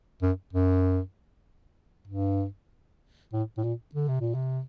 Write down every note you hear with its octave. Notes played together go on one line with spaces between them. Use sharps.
F#2
F#2
G2
A2
A2
A#2
D3
C3
A#2
C3